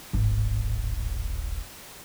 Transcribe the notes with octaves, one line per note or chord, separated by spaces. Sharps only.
D1 G#1